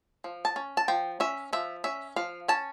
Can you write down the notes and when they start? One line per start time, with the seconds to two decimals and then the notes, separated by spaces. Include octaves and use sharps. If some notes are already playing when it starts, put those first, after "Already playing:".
0.24 F3
0.45 A5
0.56 C#4
0.77 A5
0.88 F3 G5
1.20 C#4 E5
1.53 F3 E5
1.84 C#4 E5
2.16 F3 F5
2.48 C#4 A5